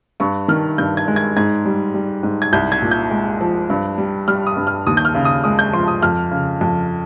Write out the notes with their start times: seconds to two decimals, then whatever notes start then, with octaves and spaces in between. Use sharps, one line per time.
0.20 G2 C#6
0.48 D#3 F6
0.78 G2 G6
0.97 G#6
1.08 G#3
1.16 G#6
1.36 G#2 G#6
1.65 G3
1.94 G3
2.23 G#2
2.42 G#6
2.53 C2 G6
2.72 G#6
2.82 A#2
2.91 G6
3.11 G#3
3.41 F3
3.70 G2
3.98 G3
4.28 G3 F6
4.47 D#6
4.57 G2
4.67 F6
4.87 D#2 D#6
4.97 G6
5.05 F6
5.15 C#3
5.25 D#6
5.44 G#3 D#6
5.59 G6
5.73 F3 C6
5.88 D#6
6.03 F2 F6
6.31 C#3
6.61 F2